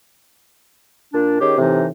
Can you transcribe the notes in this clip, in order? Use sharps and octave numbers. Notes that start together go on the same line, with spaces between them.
A#2 D4
D#3 C#4 G4 G#4
A2 C3 E3 D#4